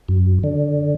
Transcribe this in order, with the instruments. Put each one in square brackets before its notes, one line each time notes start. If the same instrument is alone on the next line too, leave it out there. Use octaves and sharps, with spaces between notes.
[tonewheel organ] F#2
D3